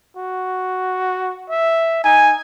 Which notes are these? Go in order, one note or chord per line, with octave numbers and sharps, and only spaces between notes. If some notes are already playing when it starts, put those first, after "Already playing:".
F#4
E5
D#4 G#5